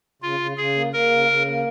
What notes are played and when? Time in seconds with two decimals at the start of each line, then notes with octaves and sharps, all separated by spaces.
0.22 C#3 F4
0.40 C#3
0.57 C#3 G#4
0.75 A#3
0.93 A#3 A#4
1.11 C#3
1.29 C#3
1.46 A#3